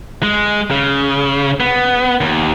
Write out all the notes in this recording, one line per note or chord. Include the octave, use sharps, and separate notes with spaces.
G#3
C#3
B3
D#2